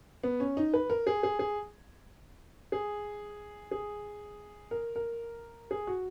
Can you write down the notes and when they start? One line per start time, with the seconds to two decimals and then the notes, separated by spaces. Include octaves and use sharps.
0.23 B3
0.40 C#4
0.57 D#4
0.73 B4
0.90 A#4
1.07 G#4
1.23 G#4
1.39 G#4
2.72 G#4
3.71 G#4
4.71 A#4
4.96 A#4
5.71 G#4
5.87 F#4